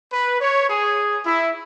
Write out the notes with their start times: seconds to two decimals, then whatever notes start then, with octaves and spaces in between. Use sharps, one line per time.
0.12 B4
0.41 C#5
0.69 G#4
1.26 E4